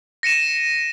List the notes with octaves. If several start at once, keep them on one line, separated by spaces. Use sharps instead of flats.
A#6 C#7 D#7 E7